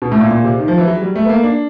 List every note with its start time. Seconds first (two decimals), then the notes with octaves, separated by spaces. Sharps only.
0.02 B2
0.12 A2
0.21 A#2
0.31 A#2
0.44 C3
0.59 D#3
0.68 F3
0.78 E3
0.87 F#3
1.02 G3
1.16 A3
1.25 B3
1.29 A#3
1.43 D4